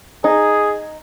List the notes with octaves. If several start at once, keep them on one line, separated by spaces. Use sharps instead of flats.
D#4 G#4